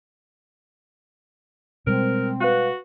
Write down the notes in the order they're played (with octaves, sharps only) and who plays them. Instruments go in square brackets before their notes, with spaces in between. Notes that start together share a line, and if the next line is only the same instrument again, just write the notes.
[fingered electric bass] B2 G3 G#3 [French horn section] C4 [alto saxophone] A#4
[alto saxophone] F#4 [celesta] B4 F5 F#6